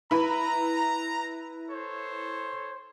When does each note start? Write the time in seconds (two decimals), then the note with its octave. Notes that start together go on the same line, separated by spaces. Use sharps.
0.11 E4 B4 A#5 B5
1.69 A4 C5 C#5